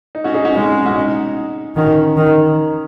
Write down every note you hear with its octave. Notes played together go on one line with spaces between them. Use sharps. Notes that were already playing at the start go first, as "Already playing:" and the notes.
D#4
C#4 F#4
D#4 G#4
C#4 F#4
G#3 D#4
C#4
D#4
C#4 F#4
D#4
D#3 C#4 F#4
D#3